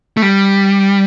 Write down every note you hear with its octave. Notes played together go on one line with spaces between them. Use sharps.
A3
G3